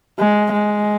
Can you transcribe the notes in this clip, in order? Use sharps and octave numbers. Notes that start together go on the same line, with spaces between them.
G#3
G#3